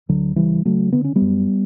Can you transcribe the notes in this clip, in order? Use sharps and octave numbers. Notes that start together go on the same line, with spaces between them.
D2 D3 F#3
C#3 E3 G3
C#3 F#3 A3
D3 B3
C#4
G3 B3
F#2